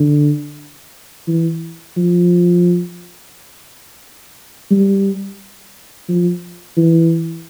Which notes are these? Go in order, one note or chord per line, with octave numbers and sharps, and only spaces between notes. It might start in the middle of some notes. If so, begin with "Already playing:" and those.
Already playing: D3
E3
F3
G3
F3
E3